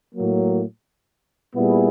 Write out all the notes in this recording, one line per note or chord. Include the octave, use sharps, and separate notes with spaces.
A2 F#3 A#3
A#2 G3 B3 E4 G#4